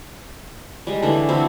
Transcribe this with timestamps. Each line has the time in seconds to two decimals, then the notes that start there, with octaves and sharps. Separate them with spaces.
0.87 G3 G#3
1.02 D3 E3 A3 D4
1.29 C4 E4 F#4